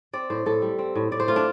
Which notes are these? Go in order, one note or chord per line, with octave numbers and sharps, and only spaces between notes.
C4 D5
A2 C5
A2 A4
G3
C4
A2
A2 D5
C5
A3 F4
D4